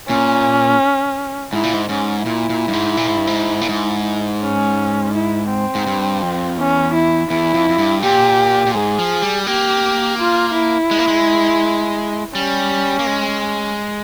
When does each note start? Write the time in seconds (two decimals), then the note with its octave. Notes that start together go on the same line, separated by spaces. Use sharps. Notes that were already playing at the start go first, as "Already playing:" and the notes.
0.09 A#2 C#4
1.53 G#2 E4
1.63 A#2
1.74 G#2
1.89 G#2 C#4
2.25 A#2 E4
2.50 A#2
2.68 G2
2.73 G#2
2.97 A#2
3.07 G#2
3.17 G2
3.27 G#2
3.61 A#2
3.69 G#2
4.42 C#4
5.14 E4
5.50 C4
5.75 G#2
5.87 G2
6.22 F2
6.58 E2 C#4
6.94 E4
7.30 E2 E4
7.54 F2
7.69 F2
7.79 G2
8.02 A#2 G4
8.66 A#2
8.74 G#2 G#4
8.99 F3
9.22 G3
9.47 A#3 G4
10.18 F4
10.54 E4
10.91 G#3
10.99 A#3
11.07 G#3
12.35 G3 C#4
12.99 A#3
13.07 G#3